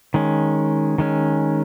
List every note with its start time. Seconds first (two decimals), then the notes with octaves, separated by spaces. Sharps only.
0.14 D#3 G#3 C#4
0.98 D#3 G#3 C#4